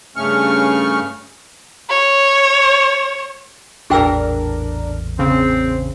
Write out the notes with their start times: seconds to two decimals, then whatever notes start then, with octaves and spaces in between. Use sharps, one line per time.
0.16 G2 C#3 A3 C#4 C#6 F6
1.90 C#5
3.90 A1 E2 A#2 D4 G#4 A#4 G5 E6
5.19 C#3 C4